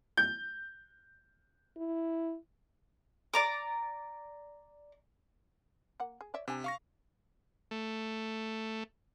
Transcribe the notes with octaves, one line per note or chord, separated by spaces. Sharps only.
G6
E4
D5 A#5 D6
A#3 F#5
G#4
C#5 D5 E5
C3 D4 G#5
F5 C#6 A#6
A3